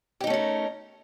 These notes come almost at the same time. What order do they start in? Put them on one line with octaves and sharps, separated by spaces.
G4 D#4 A3 C#4 A#4